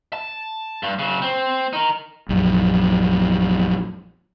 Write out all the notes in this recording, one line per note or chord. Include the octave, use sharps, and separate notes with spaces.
A5
G2
C#3 F#3
C4
D#4 A#4
A#1 F#2